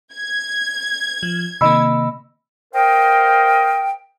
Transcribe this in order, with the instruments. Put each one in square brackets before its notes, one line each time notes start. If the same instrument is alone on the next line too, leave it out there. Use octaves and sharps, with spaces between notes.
[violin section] G#6
[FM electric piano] F3
[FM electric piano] C3 D#3 A#3 [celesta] D#5 B5 E6
[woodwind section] A#4 C5 D#5 F5 G5